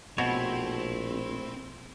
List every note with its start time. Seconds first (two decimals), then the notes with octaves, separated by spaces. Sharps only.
0.18 A#1 B2 A3 C4 E4 C#5